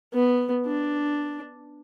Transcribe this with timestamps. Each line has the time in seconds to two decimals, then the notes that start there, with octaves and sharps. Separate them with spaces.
0.14 B3
0.67 D4